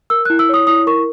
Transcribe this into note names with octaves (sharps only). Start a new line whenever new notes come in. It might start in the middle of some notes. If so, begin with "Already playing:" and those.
A#4 E6
E4 F#6
E6
C#5 D#6
E4 D#6
A#4 C#6